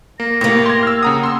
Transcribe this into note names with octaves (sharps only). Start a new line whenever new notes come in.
A#3 A#6
A2 A#3 G4
C6 G#6
E6 F6
C#3 F#5 A#5 D#6
C6 E6